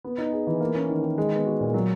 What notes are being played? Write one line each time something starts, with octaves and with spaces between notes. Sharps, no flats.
B3
D#4
G#4
E3
A#3
C#4
D#3
D#3
G#3
B3
F#4
A#2
F#3